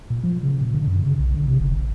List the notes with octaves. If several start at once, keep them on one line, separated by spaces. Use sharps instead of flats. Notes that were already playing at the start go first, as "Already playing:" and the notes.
A#2
F3
C#3
A#2
D3
F#2
C#3
B1
D3
C3
F1
A1